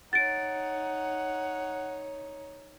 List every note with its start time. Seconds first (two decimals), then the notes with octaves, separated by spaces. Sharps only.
0.13 D#4 C#5 F#5 A6 D7